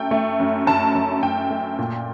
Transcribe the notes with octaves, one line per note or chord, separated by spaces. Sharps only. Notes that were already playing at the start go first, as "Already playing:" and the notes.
Already playing: F#2 A3 G5
A3
F#2
F#2 A5
F#2
F#2 G5
A3
A#2